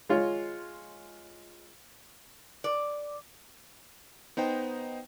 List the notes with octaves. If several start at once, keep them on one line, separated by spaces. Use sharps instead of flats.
G#3 F4 C#5
D5
B3 D#4 C5 G5